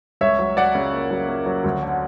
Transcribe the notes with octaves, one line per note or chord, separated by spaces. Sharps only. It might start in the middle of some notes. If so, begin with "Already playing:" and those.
C#2 C#5 E5
F#3
F#3 D5 F#5
C#3
A#3
F#3
A#3
F#3
D2
D3